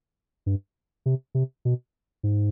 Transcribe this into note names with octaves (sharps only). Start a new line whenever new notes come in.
G2
C3
C3
B2
G#2